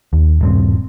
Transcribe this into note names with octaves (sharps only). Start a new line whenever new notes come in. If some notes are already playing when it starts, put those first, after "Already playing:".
D#2
D#1 G2 C4